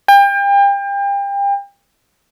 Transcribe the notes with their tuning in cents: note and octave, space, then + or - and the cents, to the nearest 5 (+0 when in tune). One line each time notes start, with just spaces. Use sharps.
G5 +35